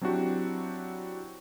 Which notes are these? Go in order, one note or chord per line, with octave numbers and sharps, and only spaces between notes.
F#3 C4 D4 E4 F#4 G4